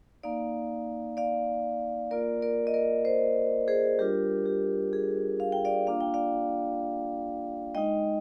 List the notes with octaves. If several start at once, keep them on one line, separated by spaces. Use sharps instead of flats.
A#3 D#4 D5 F5
D5 F5
A#3 F4 A#4 D5
A#4 D5
D#5
A#4 D5
C5 D#5
G#4 C5
G3 D4 F4 G4 A#4
G4
G#4
F5
G5
D5 F5
A#3 D4 F4 F5
G5
D5 F5
G#3 D#4 D#5 G5